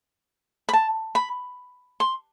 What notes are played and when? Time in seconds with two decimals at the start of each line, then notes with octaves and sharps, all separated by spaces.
0.69 B5
0.73 A5
1.15 B5
2.00 C6